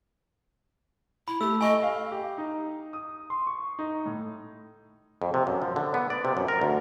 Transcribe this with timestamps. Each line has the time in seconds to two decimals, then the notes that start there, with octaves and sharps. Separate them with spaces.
1.28 E4 B5
1.41 A3 G4 E6
1.61 D#5 G#5 C#6
1.83 F5
2.11 G4
2.38 D#4
2.93 D#6
3.30 C6
3.47 C#6
3.79 D#4
4.05 A2
5.22 F2
5.34 C3
5.47 F#2
5.62 F3
5.76 D3
5.94 B3
6.10 D5
6.25 C3
6.37 F#2
6.48 A#4
6.61 D2